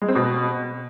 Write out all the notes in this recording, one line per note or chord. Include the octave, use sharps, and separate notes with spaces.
G#3
C4
B2